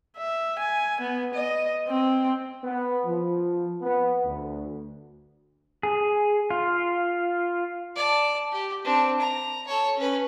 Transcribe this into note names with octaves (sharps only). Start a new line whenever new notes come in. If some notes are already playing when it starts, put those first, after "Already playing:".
E5
G#5
B3
D#5
C4
B3
F3
B3
D2
G#4
F4
D5 A5
G4
C4 D4
A#5
A4 C#5
C#4 B4